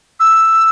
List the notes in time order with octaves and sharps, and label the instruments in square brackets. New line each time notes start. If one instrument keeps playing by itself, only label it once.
[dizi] E6